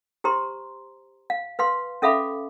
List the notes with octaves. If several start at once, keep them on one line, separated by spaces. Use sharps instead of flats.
G4 C5 A#5 C6
F5
B4 F5 C6
C#4 A4 E5 F5 B5 D6